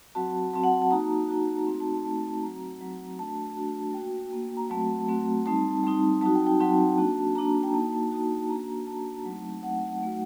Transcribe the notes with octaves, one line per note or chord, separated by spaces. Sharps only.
F#3 C4 F#4 A5
F#3 C4 F#4 A5
F#5
A5
A#3 D#4 F#4 A#5
A#3 D#4 F#4
A3 C4 D#4 F#4
A5
A5
A3 C4 D#4 F#4 A5
F#3 C4 F#4 A#5
F#3 C4 F#4
A3 D4 F#4 A5
A3 D4 F#4
A#3 F#4 G5
A#3 F#4
A#5
F#3 A3 C4 F#4 A5
F#3 A3 C4 F#4
G3 C4 D#4 A5
G3 C4 D#4
F#3 C4 D#4 F#4 A5
G5
G5
F#3 C4 D#4 F#4 A5
A#3 D4 F#4
A#3 D4 F#4 A#5
G5
A#3 D#4 F#4 A5
A#3 D#4 F#4
A#3 D4 F#4 A#5
A#3 D4 F#4 A5
F#3 A3 C4 D#4
F#3 A3 C4 D#4 F#5
F#3 A3 D#4 F#4